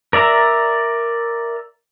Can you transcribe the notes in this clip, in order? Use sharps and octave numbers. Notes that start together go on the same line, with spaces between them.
A#4 D5 E5 A#5